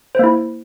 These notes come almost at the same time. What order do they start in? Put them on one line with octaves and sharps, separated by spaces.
C5 A#3 E4